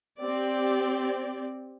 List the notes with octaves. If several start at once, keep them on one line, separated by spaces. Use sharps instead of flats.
C4 G4 D5